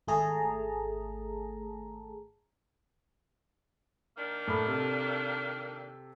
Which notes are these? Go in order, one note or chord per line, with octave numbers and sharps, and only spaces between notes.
G#1 A3 G#4 A5 A#5
D#3 A#3 D4
A2 B5
C3 A4